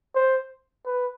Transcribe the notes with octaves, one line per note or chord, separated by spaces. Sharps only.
C5
B4